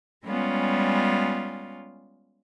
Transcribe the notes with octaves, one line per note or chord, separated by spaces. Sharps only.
G3 G#3 B3 C#4 F4